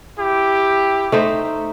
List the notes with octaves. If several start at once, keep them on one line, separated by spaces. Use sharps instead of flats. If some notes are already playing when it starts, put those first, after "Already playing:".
E4 G4
A3 D#4 C5